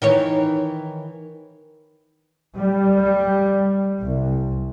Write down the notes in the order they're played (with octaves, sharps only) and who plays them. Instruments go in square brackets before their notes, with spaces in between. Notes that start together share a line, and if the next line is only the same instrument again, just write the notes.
[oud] D#3 E3 C#5
[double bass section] G3
C2